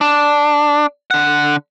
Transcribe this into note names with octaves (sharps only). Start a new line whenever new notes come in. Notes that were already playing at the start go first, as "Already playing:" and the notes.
D4
D3 F#5